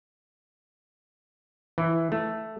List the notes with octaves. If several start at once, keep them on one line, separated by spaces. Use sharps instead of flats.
E3
A3